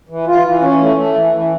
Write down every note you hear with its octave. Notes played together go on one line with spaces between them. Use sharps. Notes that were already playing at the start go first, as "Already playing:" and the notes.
E3
F4
E3
C#4
A3
A3
E3
E3